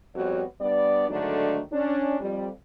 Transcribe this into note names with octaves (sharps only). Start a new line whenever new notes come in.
F2 G3 B3 F#4 C#5
G3 B3 D4 D5
G#2 D3 D#3 F#3 A3 D4
C#4 D4
F2 G3